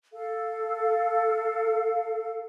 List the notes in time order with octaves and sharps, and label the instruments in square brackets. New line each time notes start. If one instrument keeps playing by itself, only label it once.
[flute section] A4 F5